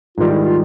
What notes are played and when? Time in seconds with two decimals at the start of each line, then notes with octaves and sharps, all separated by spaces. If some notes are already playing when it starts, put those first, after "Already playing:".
0.18 G#2 D#3 G3 F4
0.31 E4
0.44 F4